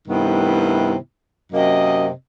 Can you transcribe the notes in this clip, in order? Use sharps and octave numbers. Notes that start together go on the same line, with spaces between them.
G2 C3 D#3 A3 B3 E4
F#2 C3 A#3 D#5